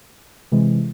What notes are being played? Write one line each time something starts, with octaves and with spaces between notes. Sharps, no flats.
C3 E3 G#3